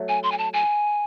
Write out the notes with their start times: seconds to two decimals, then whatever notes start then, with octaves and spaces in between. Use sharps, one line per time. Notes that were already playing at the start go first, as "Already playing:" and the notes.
Already playing: F#3 A3
0.09 G#5
0.23 C6
0.32 G#5
0.38 A5
0.53 G#5